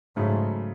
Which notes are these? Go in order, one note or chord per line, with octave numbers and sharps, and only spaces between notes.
G#2 C#3 F#3 A3 C#4